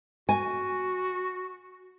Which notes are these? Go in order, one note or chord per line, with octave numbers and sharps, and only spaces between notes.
F#4 G#5